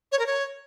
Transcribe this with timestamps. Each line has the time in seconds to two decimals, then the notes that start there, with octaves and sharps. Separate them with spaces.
0.12 C#5
0.19 A#4
0.26 C#5